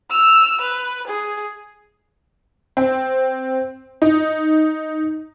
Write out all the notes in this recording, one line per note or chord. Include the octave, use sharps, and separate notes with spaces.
E6 F6
B4
G#4
C4
D#4